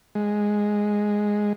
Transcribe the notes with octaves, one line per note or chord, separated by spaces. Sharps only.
G#3